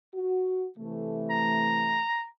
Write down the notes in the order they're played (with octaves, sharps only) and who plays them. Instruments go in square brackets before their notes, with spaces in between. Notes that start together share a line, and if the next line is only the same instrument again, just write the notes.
[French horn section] F#4
C3 E3 A3
[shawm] A#5